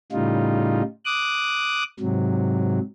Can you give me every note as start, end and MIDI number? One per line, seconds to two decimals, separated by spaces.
0.12 0.82 45
0.12 0.82 49
0.12 0.82 55
0.12 0.82 63
0.12 0.82 65
1.05 1.83 86
1.05 1.83 87
1.05 1.83 90
1.99 2.79 44
1.99 2.79 48
1.99 2.79 54